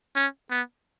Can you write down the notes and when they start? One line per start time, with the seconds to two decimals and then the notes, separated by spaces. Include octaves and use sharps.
0.16 C#4
0.50 B3